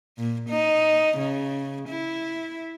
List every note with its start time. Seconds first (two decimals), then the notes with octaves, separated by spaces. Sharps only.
0.18 A#2
0.49 D#4
1.18 C#3
1.89 E4